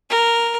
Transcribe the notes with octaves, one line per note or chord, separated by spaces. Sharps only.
A#4